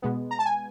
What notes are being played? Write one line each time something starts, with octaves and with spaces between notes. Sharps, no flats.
B2 G#3 B3
A#5
A5
G#5